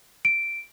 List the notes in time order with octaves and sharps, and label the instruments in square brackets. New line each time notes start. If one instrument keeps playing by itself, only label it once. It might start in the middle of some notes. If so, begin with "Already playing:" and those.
[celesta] D7